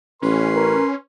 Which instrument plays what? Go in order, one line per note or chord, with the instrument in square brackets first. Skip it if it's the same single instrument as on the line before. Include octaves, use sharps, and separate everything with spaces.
[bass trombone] A1 [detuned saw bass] C#4 [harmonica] B4 C6
[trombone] A#4